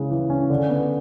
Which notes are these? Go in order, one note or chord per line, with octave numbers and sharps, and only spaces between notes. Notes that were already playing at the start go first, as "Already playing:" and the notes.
Already playing: C#3 E3 G#3 C#4
E3
C#4
D3
B3